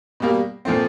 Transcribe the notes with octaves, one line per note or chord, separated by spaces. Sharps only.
B2 G3 A#3
A#2 F3 A3 C4